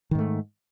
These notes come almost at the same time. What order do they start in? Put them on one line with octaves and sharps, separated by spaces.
D#3 G#2 A3